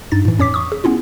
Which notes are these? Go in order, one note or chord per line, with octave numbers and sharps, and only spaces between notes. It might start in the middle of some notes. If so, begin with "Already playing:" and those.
G2 D#4 A6
A2 E3
F2 C#4 C#5 D6 B6
C#6 D#6
G#4
B3 C#4 E4 F4